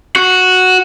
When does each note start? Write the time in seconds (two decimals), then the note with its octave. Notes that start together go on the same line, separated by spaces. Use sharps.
0.16 F#4